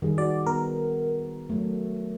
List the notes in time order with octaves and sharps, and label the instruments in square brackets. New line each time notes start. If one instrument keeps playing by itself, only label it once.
[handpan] D#3 G3 G#4
[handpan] F#4 [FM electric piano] D5
[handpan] B3 [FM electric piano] A#4
[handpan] F#3 A3